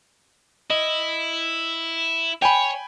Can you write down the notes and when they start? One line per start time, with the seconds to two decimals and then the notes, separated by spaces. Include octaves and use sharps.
0.70 E4 D#5
2.42 C#5 G5 G#5 B5